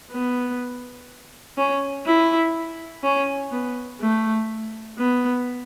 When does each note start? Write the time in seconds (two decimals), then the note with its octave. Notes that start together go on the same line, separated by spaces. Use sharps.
0.11 B3
1.57 C#4
2.06 E4
3.03 C#4
3.52 B3
4.01 A3
4.98 B3